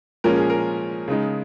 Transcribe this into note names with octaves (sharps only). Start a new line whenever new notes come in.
A#2 F3 G#3 C#4 A#4
G#4
A#4
C#3 G#3 D#4